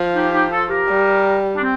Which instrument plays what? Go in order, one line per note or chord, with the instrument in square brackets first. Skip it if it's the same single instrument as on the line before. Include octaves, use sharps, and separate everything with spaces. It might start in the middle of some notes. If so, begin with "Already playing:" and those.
Already playing: [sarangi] F3
[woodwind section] D#4 G4
D#4 G4
F4 A4
G4 A#4
[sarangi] G3
[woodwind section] D4
C4